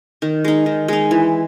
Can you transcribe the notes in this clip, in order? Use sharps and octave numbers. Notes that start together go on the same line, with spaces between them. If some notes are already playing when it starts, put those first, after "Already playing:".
D#3
G#3 D#4
D#3
G#3 D#4
E3